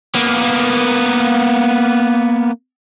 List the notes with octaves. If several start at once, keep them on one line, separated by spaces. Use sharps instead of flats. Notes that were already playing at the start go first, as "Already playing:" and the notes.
A#3 B3